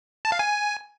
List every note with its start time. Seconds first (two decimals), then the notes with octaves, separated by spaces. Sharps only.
0.25 A5
0.32 F5
0.39 G#5